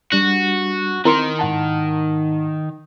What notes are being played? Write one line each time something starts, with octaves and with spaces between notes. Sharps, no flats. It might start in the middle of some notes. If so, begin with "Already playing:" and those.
G3 D4 F#4 F#6
D#3 C4 E4 A#4 C6
G#2 F#5 A5